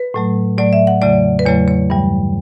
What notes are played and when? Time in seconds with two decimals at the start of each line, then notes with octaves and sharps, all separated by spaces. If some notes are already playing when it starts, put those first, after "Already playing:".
Already playing: B4
0.14 A2 F#3 A3
0.58 A2 F#3 A3 D5
0.73 E5
0.87 F#5
1.02 E2 C#3 F#3 A3 D5
1.39 B4
1.45 E2 C#3 F#3 A3 C#5
1.68 C#5
1.90 G2 E3 G3